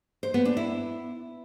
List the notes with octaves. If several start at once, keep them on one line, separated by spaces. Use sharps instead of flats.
C5
B3
D4
E4